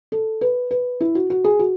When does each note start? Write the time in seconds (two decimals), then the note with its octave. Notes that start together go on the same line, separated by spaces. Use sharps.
0.12 A4
0.41 B4
0.71 B4
1.01 E4
1.15 F#4
1.30 F#4
1.44 G#4
1.59 F#4